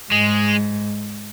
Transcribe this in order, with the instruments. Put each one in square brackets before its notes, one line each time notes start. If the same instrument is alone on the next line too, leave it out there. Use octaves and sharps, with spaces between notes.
[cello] G#2 [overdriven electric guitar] G#3